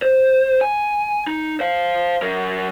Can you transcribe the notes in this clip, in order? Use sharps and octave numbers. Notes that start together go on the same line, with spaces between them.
C5
G#5
D#4
C5 F5
F#3 A#4